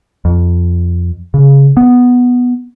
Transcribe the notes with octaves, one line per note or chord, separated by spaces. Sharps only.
F2
C#3
B3